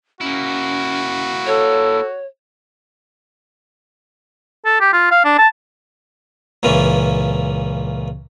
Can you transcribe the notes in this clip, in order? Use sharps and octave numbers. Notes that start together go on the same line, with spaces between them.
A#3 C#4 E4 F#4
A4 C#5
A4
G4
F4
F5
D4
A5
C#2 A#2 E3 C#4